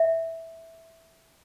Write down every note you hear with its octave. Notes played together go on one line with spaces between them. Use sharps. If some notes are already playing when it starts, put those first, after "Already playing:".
Already playing: E5